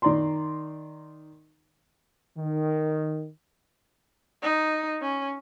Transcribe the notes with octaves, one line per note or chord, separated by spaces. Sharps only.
D#3 D5 A#5 C6
D#3
D#4
C#4